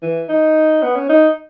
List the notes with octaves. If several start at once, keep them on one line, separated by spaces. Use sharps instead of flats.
E3
D#4
B3
C#4
D#4